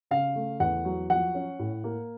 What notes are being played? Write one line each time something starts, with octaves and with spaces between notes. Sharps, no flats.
C#3 F5
A3
E2 F#5
F#3
F3 F#5
C#4
A2
A#3